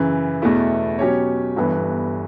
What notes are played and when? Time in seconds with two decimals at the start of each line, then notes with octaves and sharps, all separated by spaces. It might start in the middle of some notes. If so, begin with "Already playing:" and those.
Already playing: F#2 C#3 E3
0.42 E2 B2 A3 E4
0.99 B2 F#3 C#4 G4 C#5
1.56 G1 G2 E3 B3